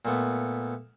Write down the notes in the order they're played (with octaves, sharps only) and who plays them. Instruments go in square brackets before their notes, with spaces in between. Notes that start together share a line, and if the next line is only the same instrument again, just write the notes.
[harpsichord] A#2 A3 B3